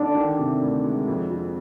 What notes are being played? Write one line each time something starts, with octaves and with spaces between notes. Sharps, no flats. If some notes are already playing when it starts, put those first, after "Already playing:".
Already playing: D3 D4 D5
D#3
C3
D2
G#3
F2
F3